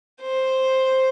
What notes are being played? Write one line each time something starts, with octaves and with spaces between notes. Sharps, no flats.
C5